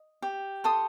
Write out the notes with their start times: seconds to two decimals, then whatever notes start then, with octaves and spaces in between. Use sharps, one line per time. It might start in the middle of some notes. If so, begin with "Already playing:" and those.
Already playing: D#5
0.22 G4
0.64 A4 C6 D#6